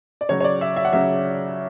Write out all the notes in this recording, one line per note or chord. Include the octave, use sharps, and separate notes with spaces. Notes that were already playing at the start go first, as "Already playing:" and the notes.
D5
C#3 F#3 C#5
C#5
D5
E5
E5
F#5
C#3 F#3 E5